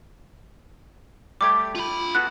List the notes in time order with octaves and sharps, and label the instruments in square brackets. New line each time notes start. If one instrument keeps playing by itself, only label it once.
[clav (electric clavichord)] G3 A3 G4 [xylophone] D6 G#6
[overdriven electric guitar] F4 B5
[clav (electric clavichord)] B3 F#4 A4 [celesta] F#6